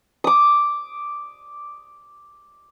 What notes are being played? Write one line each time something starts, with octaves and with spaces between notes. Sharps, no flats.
D6 D#6